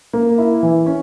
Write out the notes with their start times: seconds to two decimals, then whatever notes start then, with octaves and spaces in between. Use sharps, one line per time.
0.13 A#3
0.38 E4
0.63 E3
0.86 C#4